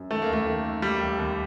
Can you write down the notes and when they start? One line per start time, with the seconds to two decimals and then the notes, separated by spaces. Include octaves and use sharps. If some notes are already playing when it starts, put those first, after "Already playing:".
Already playing: F#2
0.11 D#3 A3
0.22 A#3
0.29 D#2 A3
0.46 D#3
0.65 D#3
0.82 D#3 G3
1.01 D#2
1.19 D#2